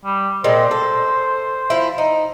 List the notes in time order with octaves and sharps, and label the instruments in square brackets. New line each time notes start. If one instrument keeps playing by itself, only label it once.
[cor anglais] G3
[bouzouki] A#2 G#3 C4 [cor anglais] C5
[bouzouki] A4
F3 E4
D#4